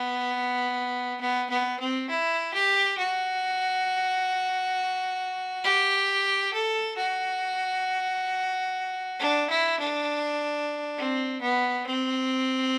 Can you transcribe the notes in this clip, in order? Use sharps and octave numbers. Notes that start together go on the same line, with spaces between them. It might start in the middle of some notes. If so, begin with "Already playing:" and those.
Already playing: B3
B3
B3
C4
E4
G4
F#4
G4
A4
F#4
D4
E4
D4
C4
B3
C4